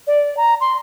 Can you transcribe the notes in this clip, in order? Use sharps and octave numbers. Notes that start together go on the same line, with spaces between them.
D5
A#5
C6